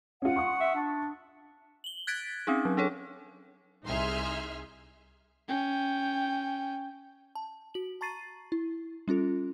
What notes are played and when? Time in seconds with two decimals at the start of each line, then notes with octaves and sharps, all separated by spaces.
0.22 C#4 F4 F#5
0.36 C6 C#6 D#6
0.61 E5
0.75 D4
1.84 F#7 G7
2.07 F#6 G#6 A6 B6 D7
2.47 C4 C#4 D#4 G#4
2.65 F#3
2.77 D4 G#4 A4 C#5
3.85 C2 D#4 G#4 E5 C6 F6
5.48 C#4 G5
7.35 A5
7.74 F#4 F#7
8.01 A5 A#5 C#6 A6 C7 D#7
8.52 E4
9.08 G3 C#4 F4 A4